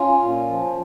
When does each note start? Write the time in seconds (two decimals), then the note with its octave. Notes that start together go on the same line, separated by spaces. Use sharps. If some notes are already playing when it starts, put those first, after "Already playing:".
Already playing: C#4 F4
0.21 A#2
0.48 F3